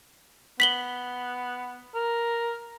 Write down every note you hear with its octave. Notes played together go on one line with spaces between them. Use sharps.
B3 B6 F#7 G7
A#4